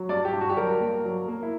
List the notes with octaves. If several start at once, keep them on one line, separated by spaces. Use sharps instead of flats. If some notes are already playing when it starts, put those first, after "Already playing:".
Already playing: F#3
G2 D5
G4
G2
F#4
G4
F#3 A#4
A#3
F#3
A#3
E4